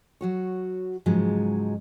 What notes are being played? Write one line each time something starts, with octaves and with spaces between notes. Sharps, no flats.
F#3 F#4 C#5
G#2 C#3 F3 F#3 G#3